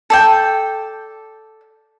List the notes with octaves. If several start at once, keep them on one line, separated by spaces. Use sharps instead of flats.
A4 D5 G5